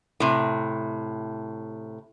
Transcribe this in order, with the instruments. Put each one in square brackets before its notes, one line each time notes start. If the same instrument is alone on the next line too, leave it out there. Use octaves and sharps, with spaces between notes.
[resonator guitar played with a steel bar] A2 C3